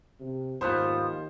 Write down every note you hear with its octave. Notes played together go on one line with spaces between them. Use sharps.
C3
D#2 G#2 F3 B3 F4 C5